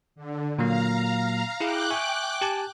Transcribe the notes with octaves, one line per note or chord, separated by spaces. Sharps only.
D3
A#2 F#3 A#3 F5 A#5
E4 G#4 F5 G5 D6 F#6
E5 G#5 C#6
G4 G#5 A5